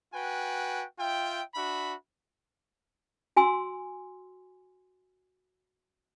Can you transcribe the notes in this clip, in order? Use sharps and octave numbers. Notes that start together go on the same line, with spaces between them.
F#4 B4 G5 G#5
F4 E5 G5
D4 F#4 E5 B5
F#4 G#5 C6 E6